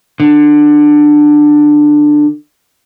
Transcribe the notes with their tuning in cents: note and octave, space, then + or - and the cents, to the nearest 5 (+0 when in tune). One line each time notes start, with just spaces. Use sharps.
D3 +15